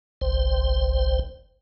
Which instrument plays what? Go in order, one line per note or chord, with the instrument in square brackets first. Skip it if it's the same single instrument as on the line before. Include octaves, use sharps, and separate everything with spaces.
[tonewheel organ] G1 C2 C5